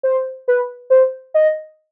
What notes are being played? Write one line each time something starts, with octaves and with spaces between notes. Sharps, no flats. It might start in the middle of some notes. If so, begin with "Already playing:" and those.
C5
B4
C5
D#5